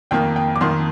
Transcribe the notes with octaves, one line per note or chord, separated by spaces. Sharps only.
F2 D#3 A#3 G5
G5
D6
F2 D#3 A#3 C6